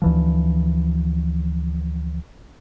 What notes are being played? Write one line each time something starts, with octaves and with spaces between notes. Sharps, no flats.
D2 E3 F3